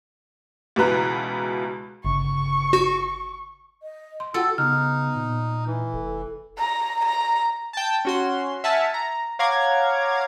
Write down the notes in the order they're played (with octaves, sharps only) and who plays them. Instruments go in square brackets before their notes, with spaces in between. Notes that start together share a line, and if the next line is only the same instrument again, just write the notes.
[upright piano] C#2 B2 E3 B4 A#5 F#6
[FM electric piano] G1 C#3 [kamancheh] C#6
[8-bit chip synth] F#4
[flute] D#5
[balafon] C6
[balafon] F4 F#5 G5 [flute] F#4 [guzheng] A4
[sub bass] C#3 [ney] B3 [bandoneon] D#4 [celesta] F6
[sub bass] A#2
[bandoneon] E3
[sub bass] F1 [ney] A4
[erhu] A#5
A#5
[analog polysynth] G5 A5
C#4 F#4 C6
E5 F#5 G#5 A5 F6
A#5
C#5 F5 F#5 A#5 D6 G#6